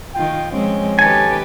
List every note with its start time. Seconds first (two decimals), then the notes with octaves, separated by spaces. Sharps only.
0.15 D#3 F4 G5
0.52 F3 G#3 C4 C#4
0.99 D#3 G4 A4 B4 G#5